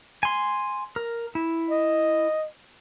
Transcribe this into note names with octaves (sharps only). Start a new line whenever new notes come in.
G#5 C6
A#4
E4
D#5